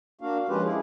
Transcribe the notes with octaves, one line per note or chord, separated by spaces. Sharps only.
A#3 D4 F#4 F5
F3 G#3 C#4 F4 G4 B4
E4 G#4